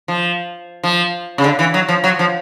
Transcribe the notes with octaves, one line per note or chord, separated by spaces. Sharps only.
F3
F3
C#3
D3
E3
F#3
F3
F#3
F3